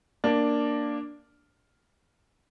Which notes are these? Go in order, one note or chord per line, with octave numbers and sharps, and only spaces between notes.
A#3 D4